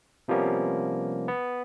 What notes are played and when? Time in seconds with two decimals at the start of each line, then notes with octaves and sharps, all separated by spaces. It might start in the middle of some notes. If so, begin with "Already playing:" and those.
0.28 C3 F3 G3 A#3 B3 C#4
1.28 B3